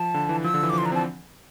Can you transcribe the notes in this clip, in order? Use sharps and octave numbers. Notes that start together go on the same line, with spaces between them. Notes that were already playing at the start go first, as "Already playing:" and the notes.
Already playing: F3 A5
D3
E3
F3 E6
D3
E3
D6
F3
C6
D4 A#5
C4 A5